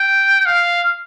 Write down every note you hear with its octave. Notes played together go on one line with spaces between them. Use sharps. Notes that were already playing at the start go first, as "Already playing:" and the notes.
Already playing: G5
F5